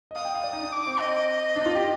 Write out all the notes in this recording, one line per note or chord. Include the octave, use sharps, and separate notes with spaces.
D#5
F5 D#6
G5
F5
D5
D#4
D4
D6
C4
D#5
D4
D#4
F4
G4